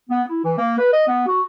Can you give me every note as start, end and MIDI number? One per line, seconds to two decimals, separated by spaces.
0.10 0.22 59
0.28 0.40 64
0.44 0.56 52
0.58 0.75 58
0.78 0.91 71
0.92 1.03 75
1.07 1.26 59
1.27 1.42 66